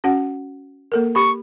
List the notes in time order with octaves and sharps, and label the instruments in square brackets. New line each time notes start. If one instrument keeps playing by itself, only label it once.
[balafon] C#4 F#4 F#5
A#3 A4 A#4
[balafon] G4 B5 [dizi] C#6